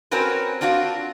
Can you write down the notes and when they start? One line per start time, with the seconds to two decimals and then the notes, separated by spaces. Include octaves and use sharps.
0.11 C4 C#4 F#4 A#4 B4
0.61 C4 D4 F4 F#4